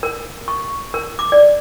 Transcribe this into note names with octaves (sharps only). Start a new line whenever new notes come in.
A#4
C#6
A#4
D6
D5